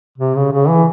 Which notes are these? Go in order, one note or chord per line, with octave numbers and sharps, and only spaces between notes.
C3
C#3
C#3
E3